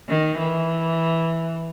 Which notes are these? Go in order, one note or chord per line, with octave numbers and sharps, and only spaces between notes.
D#3
E3